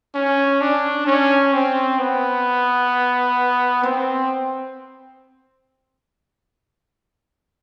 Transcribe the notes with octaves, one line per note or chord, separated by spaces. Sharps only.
C#4
D4
C#4
C4
B3
C4